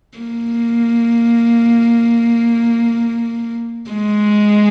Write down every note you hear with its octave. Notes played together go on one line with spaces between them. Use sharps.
A#3
G#3